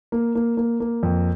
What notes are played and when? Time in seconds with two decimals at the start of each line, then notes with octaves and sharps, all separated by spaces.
0.12 A#3
0.35 A#3
0.57 A#3
0.80 A#3
1.03 F2